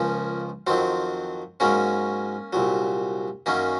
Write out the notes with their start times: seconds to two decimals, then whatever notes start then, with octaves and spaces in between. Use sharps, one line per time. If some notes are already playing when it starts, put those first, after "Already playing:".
Already playing: C#2 C#3 F3 A#3 C#4
0.67 F2 D#3 F#3 C4
1.60 G#2 F#3 A#3 C#4
2.53 C2 A#2 F#3
3.46 F#2 D#3 F#3 A#3 C#4